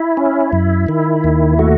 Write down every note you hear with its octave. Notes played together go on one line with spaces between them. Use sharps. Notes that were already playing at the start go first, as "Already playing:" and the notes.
Already playing: E4
C#4
F#2
D#3
D#2
A3 F#4